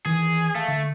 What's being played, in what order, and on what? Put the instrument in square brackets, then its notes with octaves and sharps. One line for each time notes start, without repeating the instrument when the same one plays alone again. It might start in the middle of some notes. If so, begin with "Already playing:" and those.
[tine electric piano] D#3 E3 [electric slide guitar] G#4
[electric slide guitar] A3 [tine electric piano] F5
[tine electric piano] D3